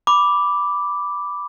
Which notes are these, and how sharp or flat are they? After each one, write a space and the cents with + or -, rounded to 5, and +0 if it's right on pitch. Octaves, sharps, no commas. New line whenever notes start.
B5 +0 D6 +0